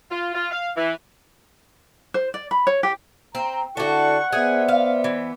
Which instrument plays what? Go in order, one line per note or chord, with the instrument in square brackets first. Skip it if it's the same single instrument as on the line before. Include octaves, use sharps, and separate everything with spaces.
[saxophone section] F4
F4
F5
E3
[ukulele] C5
D5
B5
C#5
G4
[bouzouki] C4 [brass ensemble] A#5
[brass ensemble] D3 E4 A4 [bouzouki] D4 F#4 [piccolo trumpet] F#5 [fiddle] C#6
[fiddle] B3 [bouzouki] G#4 [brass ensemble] C5 D5 E5
[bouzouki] F5
E3